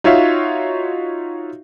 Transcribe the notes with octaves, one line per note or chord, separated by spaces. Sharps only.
D#4 F4 F#4 C#5 E5 F5